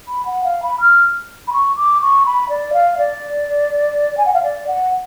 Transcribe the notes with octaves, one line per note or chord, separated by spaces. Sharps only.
B5
F#5
F5
B5
F6
B5
C#6
D6
C#6
B5
D5
F5
D5
G#5
F#5
F5
D5
F#5